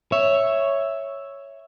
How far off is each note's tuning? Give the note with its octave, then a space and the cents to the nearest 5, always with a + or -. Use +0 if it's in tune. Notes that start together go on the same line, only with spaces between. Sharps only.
C#5 +0 E5 +0